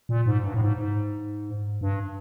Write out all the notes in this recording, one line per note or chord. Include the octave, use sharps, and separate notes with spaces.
A#2
G#2
G2
A2
G#2
G#2
G2